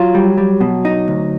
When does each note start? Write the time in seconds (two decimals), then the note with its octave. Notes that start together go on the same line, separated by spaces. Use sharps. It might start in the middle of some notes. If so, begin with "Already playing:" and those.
Already playing: F#3 F4
0.15 G3
0.38 G3
0.61 B2
0.85 D#4
1.08 D2